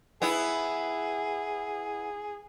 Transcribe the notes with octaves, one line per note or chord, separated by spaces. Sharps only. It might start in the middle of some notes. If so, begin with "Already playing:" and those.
B3 E4 G#4